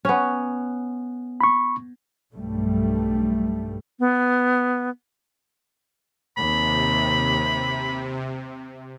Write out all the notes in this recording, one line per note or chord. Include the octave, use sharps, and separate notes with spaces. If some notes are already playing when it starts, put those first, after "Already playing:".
B3 C#4
B5 C#6
B1 G2 G3 A3
B3
D#2 C3 B5